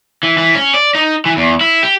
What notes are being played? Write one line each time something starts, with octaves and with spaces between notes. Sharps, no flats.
E3
E3
C#4
D5
D#4
E3
E2
E4
G4